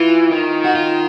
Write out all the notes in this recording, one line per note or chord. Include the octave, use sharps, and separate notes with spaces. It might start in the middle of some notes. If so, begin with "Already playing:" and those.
Already playing: E3 F4
D#3
F#4
F4